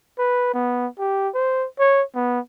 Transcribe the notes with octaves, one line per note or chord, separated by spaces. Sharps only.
B4
B3
G4
C5
C#5
B3